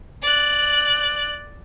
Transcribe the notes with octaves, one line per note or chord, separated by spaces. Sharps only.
D5 F#6